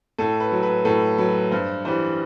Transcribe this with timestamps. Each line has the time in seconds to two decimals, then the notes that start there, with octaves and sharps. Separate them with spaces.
0.19 A2 A4
0.40 B4
0.52 F#3
0.63 B4
0.85 A2 A4
1.18 F#3 B4
1.51 G2 C5
1.85 E3 G3 C5